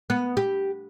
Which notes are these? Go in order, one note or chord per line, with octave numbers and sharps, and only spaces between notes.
B3
G4